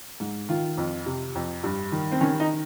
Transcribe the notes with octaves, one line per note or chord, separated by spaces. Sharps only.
G#2
D#3 F4
F2
C3
F2
G2
D#3
C4
D#3 C#4
D#4